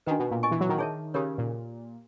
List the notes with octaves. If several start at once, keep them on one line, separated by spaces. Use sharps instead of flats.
D#3 D4 F#4 B4
B2
A#2
A#4 D#5 G#5 C#6
E3
F#3
D#3
D#4 G#4 C#5 E5 A5
C#3 G4 A#4 C#5
A#2